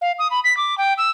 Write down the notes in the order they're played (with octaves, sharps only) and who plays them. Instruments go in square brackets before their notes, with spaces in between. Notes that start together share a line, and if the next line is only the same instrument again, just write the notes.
[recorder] F5
D#6
B5
B6
D6
G5
E6